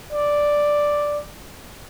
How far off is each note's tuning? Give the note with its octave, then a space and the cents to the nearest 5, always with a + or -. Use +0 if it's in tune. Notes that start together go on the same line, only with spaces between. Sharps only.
D5 +0